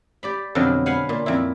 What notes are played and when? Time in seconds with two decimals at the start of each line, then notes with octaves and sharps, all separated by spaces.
0.23 G4 D5 B5
0.55 F2 B2 D3 F3 F#3
0.86 B4 F5 F#5 G#5
1.09 A#2
1.26 F2 E4